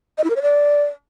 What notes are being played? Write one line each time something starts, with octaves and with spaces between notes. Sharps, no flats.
D#5
E4
A#4
C#5
D5